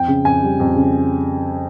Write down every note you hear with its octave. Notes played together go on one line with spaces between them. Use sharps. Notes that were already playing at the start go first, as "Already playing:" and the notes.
Already playing: F2 G5
C#3
F2 G#5
G3
F2
C#3